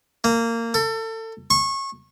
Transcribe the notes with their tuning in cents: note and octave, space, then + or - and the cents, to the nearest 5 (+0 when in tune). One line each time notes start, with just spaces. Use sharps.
A#3 -20
A4 +30
C#6 -25